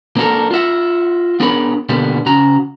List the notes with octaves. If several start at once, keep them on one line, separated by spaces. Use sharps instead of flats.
A#3 C4 D4 F#4 A4 A#4
F4 F#4 E5 F#5
B3 D4 G#4 A#4 C#5 B5
B2 D3 G3 A#3 B3
C#3 F#4 A#5